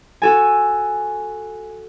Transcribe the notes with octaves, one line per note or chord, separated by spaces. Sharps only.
F#4 A4 G#5